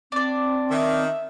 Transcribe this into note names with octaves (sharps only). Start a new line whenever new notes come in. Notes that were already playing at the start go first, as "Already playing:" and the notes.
C4 D4 D5
D#3 E5